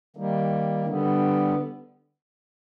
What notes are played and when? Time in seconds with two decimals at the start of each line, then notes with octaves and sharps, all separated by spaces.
0.16 D#3 G3 A#3
0.86 D3 G3 B3